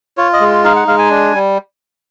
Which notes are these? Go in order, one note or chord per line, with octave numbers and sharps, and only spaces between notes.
F4 C#5
D#5
G#3
D#4 F5
F#5
G#3 F5
G#5
D4
G3